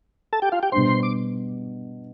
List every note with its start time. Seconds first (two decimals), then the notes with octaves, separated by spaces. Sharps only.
0.33 A4 A5
0.42 G4 G5
0.52 F4 F5
0.63 G4 G5
0.72 B2 G3 D4 C5 C6
1.03 D6